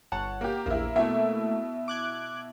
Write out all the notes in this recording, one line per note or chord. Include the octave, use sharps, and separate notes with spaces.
G1 C#5 F#5 A5
A#3 G4
A#1 E2 A#3 E4
B2 A3 A#3 E4 E5
D6 F#6 G#6